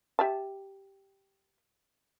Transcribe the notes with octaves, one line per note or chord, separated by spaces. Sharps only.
G4 E5 A5